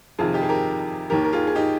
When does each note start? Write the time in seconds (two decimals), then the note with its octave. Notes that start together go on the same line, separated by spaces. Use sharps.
0.19 F2 C3 D#3 F4 G#4
0.33 D#4 G4
0.43 G#4
0.49 G4 A#4
1.10 D#2 D#3 G4 A#4
1.24 A#4
1.33 F4 G#4
1.47 G#4
1.55 D#4 G4